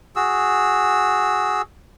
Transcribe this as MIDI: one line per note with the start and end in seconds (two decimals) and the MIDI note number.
0.16 1.62 66
0.16 1.62 68
0.16 1.62 88